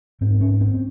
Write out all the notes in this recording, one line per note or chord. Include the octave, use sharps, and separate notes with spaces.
G#2 C4
C#4
C4